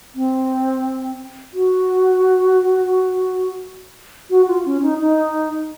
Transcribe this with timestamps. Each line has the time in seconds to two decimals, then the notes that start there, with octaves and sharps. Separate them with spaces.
0.15 C4
1.54 F#4
4.30 F#4
4.47 F4
4.65 C#4
4.82 D#4
5.00 D#4